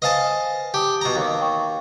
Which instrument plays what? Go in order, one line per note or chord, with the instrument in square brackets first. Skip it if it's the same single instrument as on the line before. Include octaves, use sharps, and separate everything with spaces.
[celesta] B4 C5 G#5 [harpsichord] D#5 F5 A5
[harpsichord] G4 [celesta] A5 D#6
[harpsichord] B2 A#5
D#2
[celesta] G5 C#6